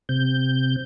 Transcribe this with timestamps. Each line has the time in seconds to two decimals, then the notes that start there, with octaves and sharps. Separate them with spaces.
0.09 C3 G6